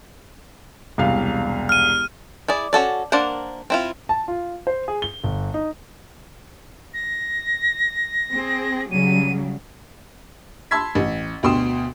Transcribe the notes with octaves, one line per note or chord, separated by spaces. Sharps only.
E1 C2 F5
F6 D#7
E4 G#4 D5
C#4 F#4 A4 D5
A#3 D4 A#4 C5 F#5
C4 E4 F4
A5
F4
C5
G#4
G7
G1
D#4
A#6
C4 G#4
C#3 F#3 G3 D#7
A5 B5 C6 E6 G#6 B6
A1
D2 B2 G5 C6 D#6 E7